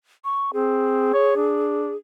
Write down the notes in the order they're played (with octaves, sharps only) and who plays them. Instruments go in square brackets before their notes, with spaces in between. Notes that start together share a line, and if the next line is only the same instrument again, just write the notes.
[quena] C#6
[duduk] C4 [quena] G#4
[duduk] C#5
D4